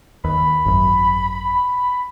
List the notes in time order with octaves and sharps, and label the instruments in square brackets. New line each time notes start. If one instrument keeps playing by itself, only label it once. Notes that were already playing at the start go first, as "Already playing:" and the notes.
[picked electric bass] D#2 [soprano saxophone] B5
[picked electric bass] G#1 F#2
[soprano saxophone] B5